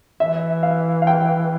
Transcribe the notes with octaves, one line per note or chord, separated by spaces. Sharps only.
E3 E5
F5
F5
G5